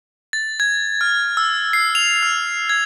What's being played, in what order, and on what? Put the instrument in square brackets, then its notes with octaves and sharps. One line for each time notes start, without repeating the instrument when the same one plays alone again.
[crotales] A6
G#6
F6
E6
C7
F7
F6
G#6